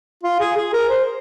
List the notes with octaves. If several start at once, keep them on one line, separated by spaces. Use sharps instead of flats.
F4
G#4
G#4
A#4
C5